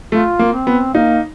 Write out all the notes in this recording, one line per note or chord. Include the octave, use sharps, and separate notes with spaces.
A3 F4
A#3
C4
B3
A#3 D#4